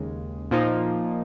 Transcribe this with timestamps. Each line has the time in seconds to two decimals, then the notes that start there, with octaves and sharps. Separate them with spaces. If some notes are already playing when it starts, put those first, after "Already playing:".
Already playing: D#2 C#3 G#3
0.51 A#2 F3 A#3 D#4